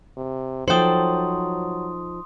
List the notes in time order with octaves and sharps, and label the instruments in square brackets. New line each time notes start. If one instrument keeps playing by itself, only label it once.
[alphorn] C3
[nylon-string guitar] F3 D#4 C5 [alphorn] F#3 [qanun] A4 G5 [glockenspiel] C6 D#6